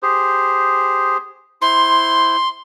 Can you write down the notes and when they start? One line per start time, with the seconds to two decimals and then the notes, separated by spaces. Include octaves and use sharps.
0.03 G4 G#4 C5
1.62 E4 C5 C6